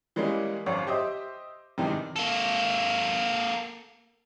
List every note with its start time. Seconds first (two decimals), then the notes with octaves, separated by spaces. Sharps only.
0.16 E3 G3 G#3 A#3 C#4
0.66 G#1 F#2 C#5 D5
0.87 G4 C5 D#5 E5 D6
1.78 G2 C3 D#3 E3 G#3
2.16 A#3 A4